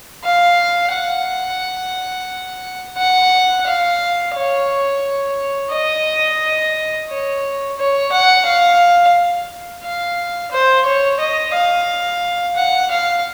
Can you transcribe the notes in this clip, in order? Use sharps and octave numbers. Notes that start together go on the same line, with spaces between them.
F5
F#5
F#5
F5
C#5
D#5
C#5
C#5
F#5
F5
F5
C5
C#5
D#5
F5
F#5
F5